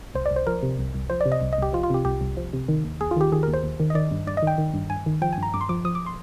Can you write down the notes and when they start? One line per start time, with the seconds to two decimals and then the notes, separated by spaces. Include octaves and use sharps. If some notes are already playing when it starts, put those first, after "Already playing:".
0.15 C2 C5
0.26 D5
0.31 C2
0.36 C5
0.47 F3 A#4
0.63 C3
0.79 C2
0.95 C2
1.10 F3 C5
1.21 D5
1.26 C3
1.32 D#5
1.42 C2
1.53 D#5
1.58 C2 G4
1.73 F3 F4
1.83 F4
1.90 C3 G4
2.05 C2 G4
2.21 C2
2.37 F3
2.53 C3
2.68 D#3
2.84 D#2
3.01 D#2 G#4
3.11 F4
3.16 D#3 G4
3.32 D#3 G#4
3.43 A#4
3.48 D#2
3.54 C5
3.63 D#2
3.80 D#3
3.90 D#5
3.95 D#3 D5
4.11 G2
4.27 G2 D5
4.37 D#5
4.42 D#3 G5
4.58 D#3
4.74 G2
4.90 G2 G#5
5.06 D#3
5.22 F3 G5
5.33 G#5
5.38 G2 A#5
5.54 G2 D6
5.61 C6
5.69 F3 D6
5.85 F3 D#6
5.95 D6
6.06 C6